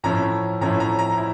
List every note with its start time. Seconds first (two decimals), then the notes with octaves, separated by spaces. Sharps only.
0.04 A2 F3 C#4 E4 A#5
0.61 A2 F3 C#4 E4 A#5
0.80 A#5
0.99 A#5
1.12 A#5
1.18 E4